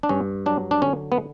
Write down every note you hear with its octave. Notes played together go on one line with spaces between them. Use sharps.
D4
G2 C#4
F#3 D4
D4
D3 C#4
B3